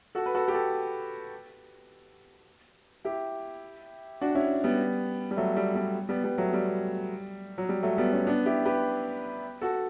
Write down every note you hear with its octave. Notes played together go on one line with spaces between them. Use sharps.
F#4 A4
B4
F#4 A4
G4
F#4 A4
E4 G4
D4 F#4
C#4 E4
G3 B3
G3
F#3 A3
G3
G3
G3 B3
G3 B3
F#3 A3
G3
F#3
G3
F#3 A3
G3 B3
A3 C#4
B3 D4
E4 G4
G4 B4
F#4 A4